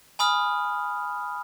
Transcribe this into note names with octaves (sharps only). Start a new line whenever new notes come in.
G#5 B5 D#6 F6